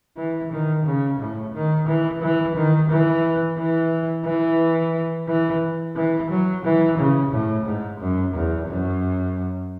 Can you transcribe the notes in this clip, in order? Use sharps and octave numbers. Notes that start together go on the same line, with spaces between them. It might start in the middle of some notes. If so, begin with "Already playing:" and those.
E3
D#3
C#3
A2
D#3
E3
E3
D#3
E3
E3
E3
E3
E3
F#3
E3
C#3
A2
G#2
F#2
E2
F#2